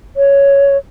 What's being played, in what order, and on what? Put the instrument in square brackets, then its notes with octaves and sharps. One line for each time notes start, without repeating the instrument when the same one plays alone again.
[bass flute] C#5